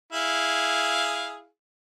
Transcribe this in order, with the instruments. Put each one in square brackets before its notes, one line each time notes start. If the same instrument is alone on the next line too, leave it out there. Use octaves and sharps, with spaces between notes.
[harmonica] E4 G#4 F5